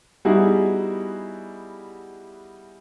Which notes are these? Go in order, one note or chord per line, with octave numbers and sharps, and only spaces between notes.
G3 B3 D#4 E4 F#4 G#4